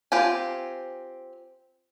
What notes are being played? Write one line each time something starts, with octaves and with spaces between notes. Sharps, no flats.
C4 F4 G4 G#5